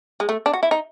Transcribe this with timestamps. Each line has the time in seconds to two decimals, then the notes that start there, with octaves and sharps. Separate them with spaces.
0.20 G#3
0.29 A3
0.46 D4
0.54 F#4
0.63 E4
0.71 D#4